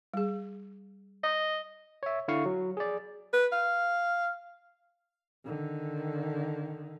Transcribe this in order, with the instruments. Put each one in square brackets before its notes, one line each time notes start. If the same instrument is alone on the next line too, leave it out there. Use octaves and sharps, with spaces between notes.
[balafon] G3 G#4
[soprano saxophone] D#5
[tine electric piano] C#5 E5
D3 E4 F5 C#6
F#3
G#4 D5
[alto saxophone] B4
F5
[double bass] D3 D#3